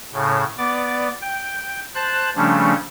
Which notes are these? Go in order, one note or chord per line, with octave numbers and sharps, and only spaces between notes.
A2 C#3
B3 D5 D6
G5
C5 A5 F#6
C#3 F3 G3 A3 C#4 D4